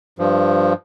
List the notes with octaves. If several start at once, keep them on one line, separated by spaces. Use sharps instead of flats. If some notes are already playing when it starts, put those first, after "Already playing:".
G2 F3